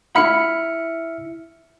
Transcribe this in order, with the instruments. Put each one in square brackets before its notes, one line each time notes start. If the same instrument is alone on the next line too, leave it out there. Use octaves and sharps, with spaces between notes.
[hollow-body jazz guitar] E4 B5 [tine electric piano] E5 F6 C#7